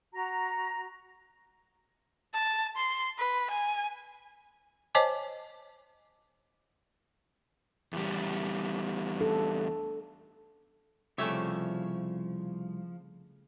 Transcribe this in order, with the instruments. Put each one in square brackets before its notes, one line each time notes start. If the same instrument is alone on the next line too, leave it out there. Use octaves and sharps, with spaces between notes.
[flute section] F#4 A#5
[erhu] A5
C6
B4
G#5
[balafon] C5 C#5 D#5 G#5 A5 D6
[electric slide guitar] E2 G3
[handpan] D4 A4
[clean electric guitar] C2 G4 C#5 [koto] C#3 A3 E5 [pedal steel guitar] F3